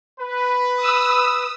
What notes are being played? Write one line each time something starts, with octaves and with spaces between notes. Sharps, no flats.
B4
D#6 E6